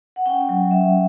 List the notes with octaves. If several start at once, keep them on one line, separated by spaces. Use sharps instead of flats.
F#5
C#4 G5
G5
F#3
C#4 E5